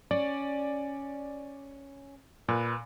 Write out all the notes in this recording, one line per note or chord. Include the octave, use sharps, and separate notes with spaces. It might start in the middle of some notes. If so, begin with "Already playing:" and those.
C#4 D5
A#2 B4